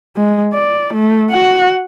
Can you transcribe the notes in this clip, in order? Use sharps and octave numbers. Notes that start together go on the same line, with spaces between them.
G#3
D5
A3
F#4 F#5